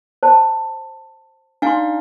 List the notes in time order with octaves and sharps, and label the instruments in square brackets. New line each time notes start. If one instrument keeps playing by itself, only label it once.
[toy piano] C5 A5
[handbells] D4 D#4 F5 [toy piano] G#5 C6